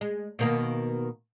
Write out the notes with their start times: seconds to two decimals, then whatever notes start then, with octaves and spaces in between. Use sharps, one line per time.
0.01 G#3
0.39 B2 D#3 A#3